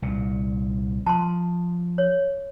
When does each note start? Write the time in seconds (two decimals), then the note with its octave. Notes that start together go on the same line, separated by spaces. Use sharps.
0.02 C2 A#2
1.06 F3 A5 C6
1.98 C#5